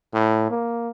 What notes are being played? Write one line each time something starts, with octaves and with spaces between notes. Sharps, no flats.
A2
A#3